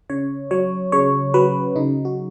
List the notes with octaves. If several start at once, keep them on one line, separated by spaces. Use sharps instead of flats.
C#3 C#5
F#3 C#5
C#3 C#5
F#3 B4
C#3 D#4
F#4